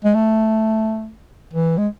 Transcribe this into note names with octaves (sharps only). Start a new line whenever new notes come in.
G#3
A3
E3
G#3